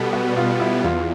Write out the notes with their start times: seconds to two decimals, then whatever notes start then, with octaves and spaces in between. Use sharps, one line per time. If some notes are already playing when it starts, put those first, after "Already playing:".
Already playing: B2 G3 B3 A4
0.13 F#4
0.37 F4
0.60 E4
0.84 E2 F4